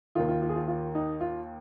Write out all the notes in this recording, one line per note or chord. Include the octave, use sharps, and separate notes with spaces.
D#2 D#3 F4
F4
F4
G#4
F4
F4
D#4
F4